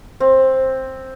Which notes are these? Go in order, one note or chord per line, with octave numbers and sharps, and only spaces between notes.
C4